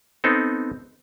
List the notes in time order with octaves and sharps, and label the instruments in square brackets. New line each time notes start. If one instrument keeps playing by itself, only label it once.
[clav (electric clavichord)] B3 C4 D#4 A4